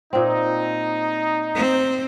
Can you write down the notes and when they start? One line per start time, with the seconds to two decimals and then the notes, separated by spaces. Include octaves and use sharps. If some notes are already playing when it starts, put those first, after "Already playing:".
0.13 A#2 C4 D#4
1.55 C4